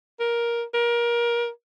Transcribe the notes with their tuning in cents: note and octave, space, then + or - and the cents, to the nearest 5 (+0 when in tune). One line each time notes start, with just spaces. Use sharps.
A#4 +10
A#4 +25